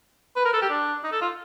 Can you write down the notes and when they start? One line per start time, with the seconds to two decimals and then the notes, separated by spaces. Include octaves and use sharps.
0.36 B4
0.45 A#4
0.53 A4
0.62 G4
0.70 D4
1.03 D#4
1.12 A4
1.21 F4